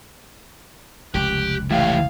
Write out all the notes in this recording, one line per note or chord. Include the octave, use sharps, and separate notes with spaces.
F1 C#2 G4 F#6
A2 E3 G4 F5